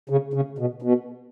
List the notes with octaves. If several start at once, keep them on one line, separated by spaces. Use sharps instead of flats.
C#3
C#3
B2
B2